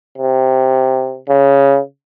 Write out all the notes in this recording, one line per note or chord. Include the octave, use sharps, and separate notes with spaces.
C3
C#3